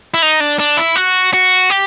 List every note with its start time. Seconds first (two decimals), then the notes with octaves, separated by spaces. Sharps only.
0.14 E4
0.22 D#4
0.40 D4
0.59 D4
0.77 E4
0.96 F#4
1.33 F#4
1.70 G4